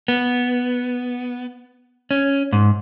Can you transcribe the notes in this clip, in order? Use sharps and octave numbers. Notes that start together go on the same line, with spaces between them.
B3
C#4
G#2